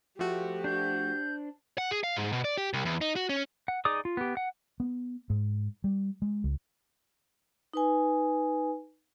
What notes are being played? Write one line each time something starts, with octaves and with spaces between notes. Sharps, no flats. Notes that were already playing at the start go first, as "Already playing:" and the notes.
F3 A3 F#4 G4
D4 C5 G6
F#5
G#4
F5
G#2
B2
D5
G4
C2
E2
D#4
F#4
C#4
F#5
D#4 G#4 D5 D6 D#6
F4
B3 G4
F#5
B3
G#2
G3
G#3
C#2
D#4 B4 G#5